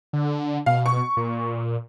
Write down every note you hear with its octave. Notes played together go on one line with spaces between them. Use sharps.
D3
B2 F5
C#6
A#2